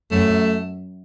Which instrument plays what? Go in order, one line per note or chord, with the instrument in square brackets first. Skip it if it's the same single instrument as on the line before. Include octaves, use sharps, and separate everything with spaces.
[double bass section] F#2 [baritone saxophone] A3